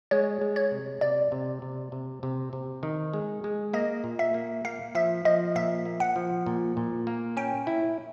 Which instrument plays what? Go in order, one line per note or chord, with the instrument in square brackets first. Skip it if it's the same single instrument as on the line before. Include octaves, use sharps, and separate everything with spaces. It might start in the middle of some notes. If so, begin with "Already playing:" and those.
[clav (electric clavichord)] G#3 [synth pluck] C#5
[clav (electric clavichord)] G#3
[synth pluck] C#5
[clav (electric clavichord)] C3
[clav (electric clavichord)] C3 [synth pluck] D5
[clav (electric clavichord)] C3
C3
C3
C3
C3
D#3
G#3
G#3
[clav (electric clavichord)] A#3 [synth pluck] D#5
[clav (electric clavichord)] A#2
[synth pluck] E5
[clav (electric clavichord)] A#3
[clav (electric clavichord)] A#3 [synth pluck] F5
[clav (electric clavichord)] F3 [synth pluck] E5
[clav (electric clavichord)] F3 [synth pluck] D#5
[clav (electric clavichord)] A#2 [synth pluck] E5
[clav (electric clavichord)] A#3
[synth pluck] F#5
[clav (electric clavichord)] F3
A#2
A#2
A#3
[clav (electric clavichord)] C#4 [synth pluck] G5
[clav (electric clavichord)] E4